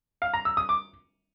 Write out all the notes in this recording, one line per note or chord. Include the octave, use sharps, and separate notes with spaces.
F5
A#5
E6
D#6
D6